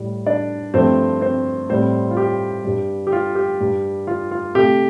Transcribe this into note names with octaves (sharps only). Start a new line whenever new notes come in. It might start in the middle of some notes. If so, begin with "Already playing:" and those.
Already playing: A2 G3
D4 D5
G2 F3 A3 C4 C5
C4 C5
A2 G3 C4 C5
F4
G4
G2 G3
G4
F4
G4
G2 G3
F4
F4
C3 A3 G4